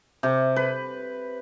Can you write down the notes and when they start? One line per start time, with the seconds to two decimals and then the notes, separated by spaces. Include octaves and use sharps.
0.23 C3
0.56 B4